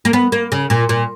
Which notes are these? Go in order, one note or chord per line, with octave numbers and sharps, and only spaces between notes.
A#3
B3
A#3
C#3
A#2
A#2